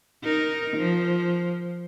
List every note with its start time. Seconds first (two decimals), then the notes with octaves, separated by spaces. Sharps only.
0.24 D#4 A#4
0.77 F3